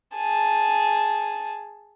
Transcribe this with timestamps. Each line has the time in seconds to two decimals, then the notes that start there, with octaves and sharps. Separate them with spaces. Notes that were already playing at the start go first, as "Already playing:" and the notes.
0.15 G#4 A5